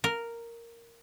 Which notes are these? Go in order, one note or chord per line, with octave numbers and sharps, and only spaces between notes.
A#4